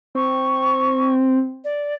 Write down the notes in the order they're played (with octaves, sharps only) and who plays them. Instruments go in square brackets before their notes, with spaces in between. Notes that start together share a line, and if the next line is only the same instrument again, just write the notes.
[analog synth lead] C4 [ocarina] C#6
[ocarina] D5